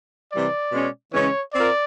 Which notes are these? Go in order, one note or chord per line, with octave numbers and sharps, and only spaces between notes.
C3 E3 G3 D5
B2 G#3 C#4
C#3 E3 G#3 C#4 C#5
C4 F4 A#4 D5